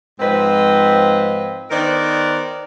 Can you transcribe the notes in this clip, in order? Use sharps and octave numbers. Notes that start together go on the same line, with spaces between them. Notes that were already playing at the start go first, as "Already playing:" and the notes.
G#2 F3 C4 B4 D#5
D#3 B3 A#4 C5 D5